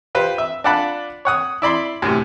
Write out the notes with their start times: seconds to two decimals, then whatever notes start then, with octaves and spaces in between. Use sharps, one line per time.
0.15 F4 G4 B4 C5
0.38 E5
0.64 D4 F4 D5 F#5 A5 B5
1.25 C#5 F#5 D#6
1.62 E4 D5 B5 C6
2.02 F#2 A2 C3